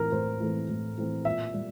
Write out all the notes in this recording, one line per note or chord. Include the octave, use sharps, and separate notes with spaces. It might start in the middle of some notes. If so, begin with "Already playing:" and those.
Already playing: A2 E3 A3 C4 A#4
A2 C5
E3 A3 C4
A2
E3 A3 C4
A#2 E5
G3